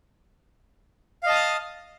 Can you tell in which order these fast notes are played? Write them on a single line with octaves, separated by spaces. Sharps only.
F5 D#5 A5 D#6 F6